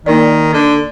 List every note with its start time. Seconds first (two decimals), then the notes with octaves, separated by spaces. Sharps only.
0.06 D#3 A#3 D#4 A#4 D5
0.53 D3